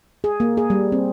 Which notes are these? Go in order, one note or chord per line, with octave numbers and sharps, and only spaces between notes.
G#4
A#3
G#4
G3
C4